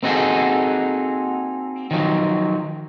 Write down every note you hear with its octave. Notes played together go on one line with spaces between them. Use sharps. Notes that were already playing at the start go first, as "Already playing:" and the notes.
A#3 C4 D#4 F#4 G#4 A4
D#3 F3 F#3